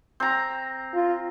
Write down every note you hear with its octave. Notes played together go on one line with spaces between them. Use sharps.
C4 A#5
F4